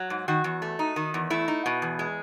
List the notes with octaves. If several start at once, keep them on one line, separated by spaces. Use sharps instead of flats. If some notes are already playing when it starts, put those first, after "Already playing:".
Already playing: F#3
G#2
D#3 F#4
E2
A3
D#4
D#3
E2
A3 E4
D#4
B2
E2
G#3